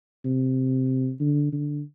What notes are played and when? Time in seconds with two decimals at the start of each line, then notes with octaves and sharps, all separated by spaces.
0.25 C3
1.20 D3
1.52 D3